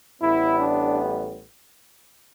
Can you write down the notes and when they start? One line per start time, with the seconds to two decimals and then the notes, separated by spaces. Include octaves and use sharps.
0.21 A1 A2 G3 B3 E4
0.60 D4